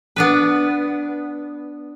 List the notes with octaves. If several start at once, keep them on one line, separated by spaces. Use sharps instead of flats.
B3 D4 B4